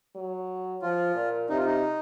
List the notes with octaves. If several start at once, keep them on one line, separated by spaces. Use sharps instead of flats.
F#3
F3 F4
A#2
C3 D#4
F4
D#4